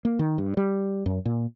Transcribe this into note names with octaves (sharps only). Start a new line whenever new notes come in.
A#3
D#3
G2
G3
F#2
A#2